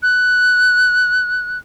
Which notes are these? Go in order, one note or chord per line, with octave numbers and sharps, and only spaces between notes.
F#6